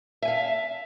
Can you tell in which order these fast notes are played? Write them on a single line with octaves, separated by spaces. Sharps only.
E5 G#5 F5